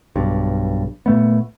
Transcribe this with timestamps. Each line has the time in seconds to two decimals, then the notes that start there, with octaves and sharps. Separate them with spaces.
0.16 B1 G2
1.06 A#2 A3 B3